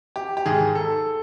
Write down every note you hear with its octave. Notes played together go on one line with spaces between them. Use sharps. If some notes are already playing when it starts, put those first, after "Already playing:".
G4
G4
G#2 D#3 G#4
A4